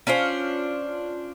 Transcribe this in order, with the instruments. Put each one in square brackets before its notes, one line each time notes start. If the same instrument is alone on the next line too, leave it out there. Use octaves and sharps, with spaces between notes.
[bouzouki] C#4 D4 F4 C5